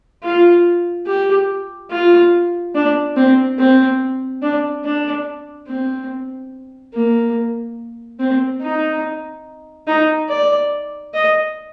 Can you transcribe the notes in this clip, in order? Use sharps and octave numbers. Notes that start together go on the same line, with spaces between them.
F4
G4
F4
D4
C4
C4
D4
D4
C4
A#3
C4
D#4
D#4
D5
D#5